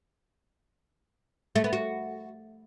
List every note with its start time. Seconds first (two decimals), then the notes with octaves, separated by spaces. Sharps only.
1.56 A3
1.64 B3
1.73 F#4